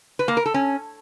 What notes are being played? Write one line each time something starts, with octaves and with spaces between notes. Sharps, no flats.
B4
A#3
A#4
A4
C#4